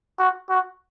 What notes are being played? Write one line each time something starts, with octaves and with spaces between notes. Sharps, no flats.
F#4
F#4